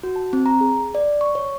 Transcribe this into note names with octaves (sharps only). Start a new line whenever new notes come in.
F#4
A5
C4
A#5
G#4
D5
C#6
C#5